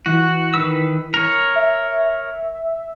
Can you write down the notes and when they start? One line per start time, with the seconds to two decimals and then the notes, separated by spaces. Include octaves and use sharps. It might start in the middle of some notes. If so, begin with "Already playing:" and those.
0.06 E3 F#4
0.54 D#3 B4 E6
1.14 A#4 C#5
1.55 E5